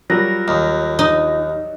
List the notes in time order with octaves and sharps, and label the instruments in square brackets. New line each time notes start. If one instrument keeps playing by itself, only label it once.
[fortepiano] F#3 G3 A#4 [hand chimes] F4 A#6
[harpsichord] D#2
[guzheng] D#4